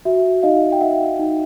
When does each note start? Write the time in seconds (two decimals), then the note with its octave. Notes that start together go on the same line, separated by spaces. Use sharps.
0.05 F#4 E5
0.43 D#4 D#5 F5
0.72 G5
0.81 D#4 E5 F#5
1.19 D#4